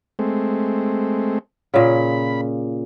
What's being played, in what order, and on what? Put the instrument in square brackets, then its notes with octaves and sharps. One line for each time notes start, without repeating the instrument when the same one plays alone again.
[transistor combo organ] G#3 A3 C4
[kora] A#2 C#3 [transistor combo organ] B5